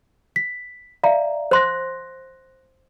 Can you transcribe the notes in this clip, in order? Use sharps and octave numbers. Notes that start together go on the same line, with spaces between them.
B6
D5 E5 F5 A#5
C5 C6 F#6 A#6